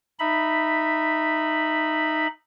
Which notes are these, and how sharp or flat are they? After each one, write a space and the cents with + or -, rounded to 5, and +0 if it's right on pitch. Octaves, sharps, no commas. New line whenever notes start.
D#4 -10 E5 +0 B5 +0